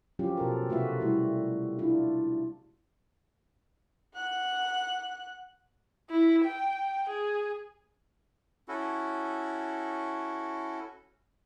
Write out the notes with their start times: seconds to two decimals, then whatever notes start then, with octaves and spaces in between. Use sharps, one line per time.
0.19 F3 F#3 C#4 F4 G4
0.37 B2 A4 A#4
0.69 C3 A3 F4 F#4 B4 E5
1.00 G3 A3 E4 F#4
1.79 D4 E4 F4
4.14 F#5 F#6
6.10 E4
6.45 G5
7.09 G#4
8.68 C#4 E4 F#4 A4